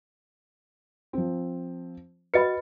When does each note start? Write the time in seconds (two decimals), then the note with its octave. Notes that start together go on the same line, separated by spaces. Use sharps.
1.13 F3 C4
2.34 F#4 B4 D#5 B5 C#7